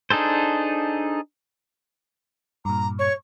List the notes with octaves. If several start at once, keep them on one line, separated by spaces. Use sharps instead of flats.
D4 D#4 G#4 A4 C5
G2 A#2 A#5
C#5 C#6